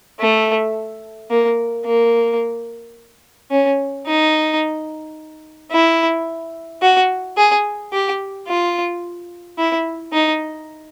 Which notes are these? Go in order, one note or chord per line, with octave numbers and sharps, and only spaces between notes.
A3
A#3
A#3
C#4
D#4
E4
F#4
G#4
G4
F4
E4
D#4